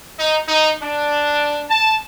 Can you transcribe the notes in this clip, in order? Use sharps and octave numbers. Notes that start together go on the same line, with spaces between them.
D#4
D#4
D4
A5